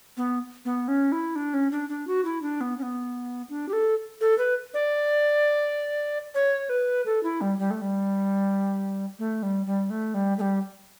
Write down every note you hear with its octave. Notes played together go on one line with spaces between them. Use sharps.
B3
B3
C#4
E4
D4
C#4
D4
D4
F#4
E4
D4
B3
C#4
B3
D4
G4
A4
A4
B4
D5
C#5
B4
A4
E4
G3
G3
A3
G3
A3
G3
G3
A3
G3
A3
G3